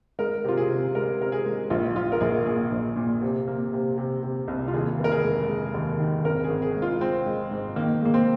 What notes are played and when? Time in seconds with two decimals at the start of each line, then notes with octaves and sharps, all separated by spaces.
0.19 G#3 A#4
0.44 C3 F4
0.57 G#4
0.69 C3
0.95 G#3 A#4
1.21 C3 A#4
1.32 G#4
1.46 G#3
1.70 A#1 F4
1.96 A#1 F4
2.12 A#4
2.20 A#1 G#4
2.46 A#2 G#4
2.71 A#1
2.96 A#2
3.21 C3
3.48 A#3
3.73 C3
3.98 C3
4.23 C3
4.48 C2
4.68 F4
4.74 D#2 G#4
4.99 F1
5.04 A#4
5.12 G#4
5.24 G#3
5.48 G#3
5.74 D#2
6.00 D#3
6.24 G#1 A#4
6.44 G#4
6.50 G#1
6.62 G#4
6.76 G#3
6.82 F4
7.01 G#3 C4
7.26 G#3
7.51 G#2
7.76 D#3 A#3
8.01 G#3 A#3
8.14 C4